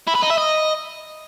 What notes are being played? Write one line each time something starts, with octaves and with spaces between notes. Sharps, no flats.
E4
B4
D#4
E5
D#5